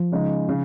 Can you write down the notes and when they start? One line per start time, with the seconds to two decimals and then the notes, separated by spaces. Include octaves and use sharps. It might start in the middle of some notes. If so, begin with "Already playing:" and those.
Already playing: F3
0.12 C#3 G#3 D#4
0.49 C#3